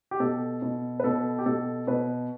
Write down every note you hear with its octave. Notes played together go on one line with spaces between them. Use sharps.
G4
B2 A4
B2
B4
B2 A4
G4
B2 A4
B2 B4